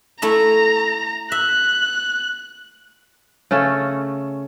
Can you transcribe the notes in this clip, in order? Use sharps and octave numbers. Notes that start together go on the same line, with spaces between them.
A3 E4 E5 A#5
E5 F#6
C#3 A3 C#4 A4